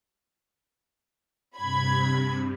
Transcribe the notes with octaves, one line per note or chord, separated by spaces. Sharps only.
G2 C3 B5 G#6